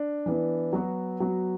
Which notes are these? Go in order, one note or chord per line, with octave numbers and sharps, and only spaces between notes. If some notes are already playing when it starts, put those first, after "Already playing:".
Already playing: D4
E3 B3 D4
F#3 B3 F#4
F#3 B3 F#4